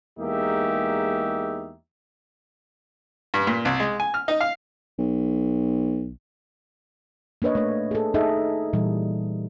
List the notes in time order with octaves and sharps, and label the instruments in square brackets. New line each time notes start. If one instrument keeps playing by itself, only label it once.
[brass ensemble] E2 G#3 A#3 D#4 G4 E5
[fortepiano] G2
A#2
C2
G#3
G#5
F6
D#4
F5
[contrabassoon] B1
[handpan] A#3 D4 B4 C#5 D#5
A3 C#5
G#4 A4
D#4 G#4 A4 D#5 E5
A#2 E3 G3